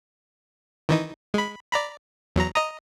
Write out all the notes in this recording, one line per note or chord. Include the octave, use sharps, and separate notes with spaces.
D#3 E3 D#4
G#3 B5
D5 A#5 B5
E2 F#3 A#5
D#5 A#5 D#6